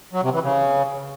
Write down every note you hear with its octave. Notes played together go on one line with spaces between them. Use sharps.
F#3
C3
E3
C#3